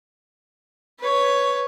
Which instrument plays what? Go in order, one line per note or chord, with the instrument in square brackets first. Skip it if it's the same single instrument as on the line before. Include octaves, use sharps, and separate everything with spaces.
[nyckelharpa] B4 C#5